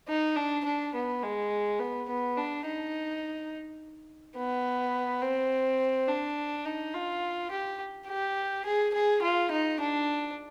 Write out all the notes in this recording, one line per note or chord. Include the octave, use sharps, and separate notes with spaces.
D#4
D4
D4
B3
G#3
B3
B3
D4
D#4
B3
C4
D4
D#4
F4
G4
G4
G#4
G#4
F4
D#4
D4